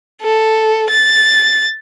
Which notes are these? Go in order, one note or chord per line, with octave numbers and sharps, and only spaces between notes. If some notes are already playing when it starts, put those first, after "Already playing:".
A4
A6